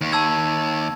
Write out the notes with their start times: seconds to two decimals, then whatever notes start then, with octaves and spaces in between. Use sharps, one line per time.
0.01 D#2
0.12 A5 E6 G#6